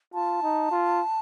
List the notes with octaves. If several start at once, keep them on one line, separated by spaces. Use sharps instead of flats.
F4 A5
D#4
F4